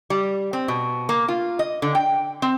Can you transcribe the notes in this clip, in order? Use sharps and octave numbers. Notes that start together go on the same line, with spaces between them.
G3
C4
B2
A#3
F4
D#5
D3
G5
C4